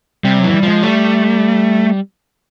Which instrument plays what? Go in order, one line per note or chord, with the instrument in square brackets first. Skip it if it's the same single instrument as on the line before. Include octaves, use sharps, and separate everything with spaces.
[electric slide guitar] C3 [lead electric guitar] G3
[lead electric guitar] F#3
[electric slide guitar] E3
[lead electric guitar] F#3
G3
[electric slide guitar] F3
[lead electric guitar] G#3
[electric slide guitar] G3 [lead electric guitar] A3